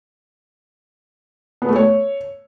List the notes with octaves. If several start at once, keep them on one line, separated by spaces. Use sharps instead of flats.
B3
A3
C#5